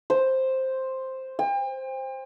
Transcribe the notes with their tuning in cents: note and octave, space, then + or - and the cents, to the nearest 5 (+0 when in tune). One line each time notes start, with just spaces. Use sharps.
C5 +5
G5 +40